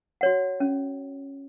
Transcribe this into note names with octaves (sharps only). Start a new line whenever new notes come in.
F#4 C#5 F#5
C#4